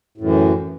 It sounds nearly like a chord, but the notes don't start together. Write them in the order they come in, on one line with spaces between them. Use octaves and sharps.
A2 F#2 E3